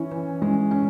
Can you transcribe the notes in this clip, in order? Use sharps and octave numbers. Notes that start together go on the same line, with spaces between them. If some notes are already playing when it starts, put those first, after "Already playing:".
Already playing: E3 C#4
E3
G#3
C#4